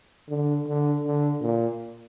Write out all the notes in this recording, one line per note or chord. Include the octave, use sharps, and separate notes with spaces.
D3
D3
D3
A#2